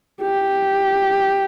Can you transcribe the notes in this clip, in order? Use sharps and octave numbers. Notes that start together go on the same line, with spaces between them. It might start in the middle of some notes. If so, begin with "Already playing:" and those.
G4